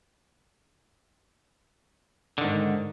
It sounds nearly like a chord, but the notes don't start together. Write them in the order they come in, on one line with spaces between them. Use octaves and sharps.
D3 D#3 G#2